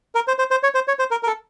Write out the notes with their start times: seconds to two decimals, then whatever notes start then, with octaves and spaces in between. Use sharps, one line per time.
0.15 A#4
0.28 C5
0.39 C5
0.51 C5
0.63 C#5
0.75 C5
0.88 C#5
0.99 C5
1.11 A#4
1.23 A#4
1.27 A4